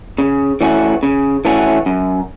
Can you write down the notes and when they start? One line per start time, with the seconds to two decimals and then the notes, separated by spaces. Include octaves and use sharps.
0.18 C#3
0.61 E3 A3 C#4 F#4
1.03 C#3
1.45 E3 A3 C#4 F#4
1.86 F#2